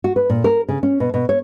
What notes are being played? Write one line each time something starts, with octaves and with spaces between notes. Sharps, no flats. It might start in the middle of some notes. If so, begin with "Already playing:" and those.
F#4
B4
A#2
A#4
C#3
C#4
B2
B2
C#5